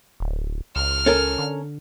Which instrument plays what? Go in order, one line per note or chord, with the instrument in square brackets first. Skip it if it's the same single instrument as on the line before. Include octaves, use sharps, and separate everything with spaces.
[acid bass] D1
[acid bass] C#2 [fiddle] F6
[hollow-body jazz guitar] C#4 A4 A#4
[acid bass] D3